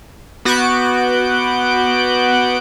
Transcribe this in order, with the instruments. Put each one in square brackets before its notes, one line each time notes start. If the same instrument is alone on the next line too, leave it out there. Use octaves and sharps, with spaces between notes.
[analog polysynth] B3 F#4 D6 F#6 G6 D7